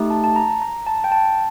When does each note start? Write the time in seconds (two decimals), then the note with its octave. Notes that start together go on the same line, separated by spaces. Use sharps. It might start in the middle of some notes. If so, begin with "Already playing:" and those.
Already playing: A3 D#4 G4
0.10 A5
0.24 A5
0.36 A#5
0.62 A#5
0.86 A5
1.04 G5
1.12 A5